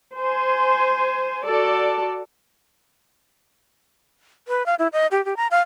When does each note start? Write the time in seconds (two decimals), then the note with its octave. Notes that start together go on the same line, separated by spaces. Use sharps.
0.16 C5 G#5
1.44 F#4 A4 D5 A5
4.48 B4
4.66 F5
4.79 E4
4.93 D#5
5.11 G4
5.25 G4
5.37 A#5
5.51 F5